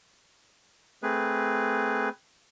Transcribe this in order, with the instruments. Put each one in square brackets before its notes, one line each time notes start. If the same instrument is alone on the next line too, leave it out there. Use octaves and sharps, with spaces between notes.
[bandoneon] A3 C4 G#4 B4